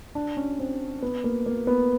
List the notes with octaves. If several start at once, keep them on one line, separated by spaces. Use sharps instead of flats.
D4
C#4
C4
B3
A#3
A#3
B3